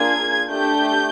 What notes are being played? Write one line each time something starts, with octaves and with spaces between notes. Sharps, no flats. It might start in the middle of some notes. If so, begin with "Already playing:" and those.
Already playing: A#3 D4 F4 G#4 G#6
A3 D4 G4 G6